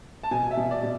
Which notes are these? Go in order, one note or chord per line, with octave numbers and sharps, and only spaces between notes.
A5
B2 G#5
E5
B2
D5
B2